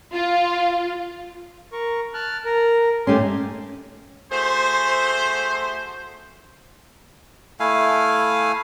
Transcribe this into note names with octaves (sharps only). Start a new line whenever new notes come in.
F4
A#4 C#6
A5 F6 F#6
A#4
G#2 A3 C#4 G4 G#5 C6
A3 F#4 G#4 C5
A3 E4 F5 G#5